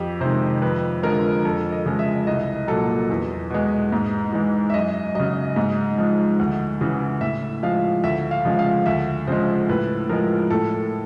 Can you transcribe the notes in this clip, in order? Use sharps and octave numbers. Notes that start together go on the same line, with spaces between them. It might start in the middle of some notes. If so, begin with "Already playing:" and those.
Already playing: F2 G4
C3 D#3 G#3 C5
F2 B4
D3 F3 G#3 A#4
F2 A4
D#5
C#3 F3 G#3
E5
C2 D#5
A#2 F#3 A4
E2
B2 G#3
G#2
E3 G#3
E5
F#2 D#5
C#3 F#3 D#5
G#2
F3 G#3
D2
C#3 E3
A2 E5
F3 G#3 F5
D2 E5
F5
C#3 F3 G#3
F5
D2 E5
C#3 F3 G#3 C5
A2 B4
F3 G#3 A#4
A2 A4